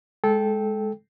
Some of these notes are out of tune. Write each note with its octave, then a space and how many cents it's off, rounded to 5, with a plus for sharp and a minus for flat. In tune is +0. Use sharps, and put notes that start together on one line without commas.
G#3 +0 A4 -20 G5 +0